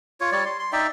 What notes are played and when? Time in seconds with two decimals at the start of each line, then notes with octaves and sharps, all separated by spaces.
0.21 F4 C#5
0.32 G3 C#5 D5
0.45 C6
0.59 C6
0.73 D#4 D5 E5 G5